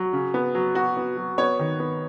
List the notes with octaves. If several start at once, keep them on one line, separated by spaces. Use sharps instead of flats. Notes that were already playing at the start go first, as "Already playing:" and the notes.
Already playing: F#3
C#3
B3
F#3
B3 F#4
B3
F#3
B3 C#5
D#3
B3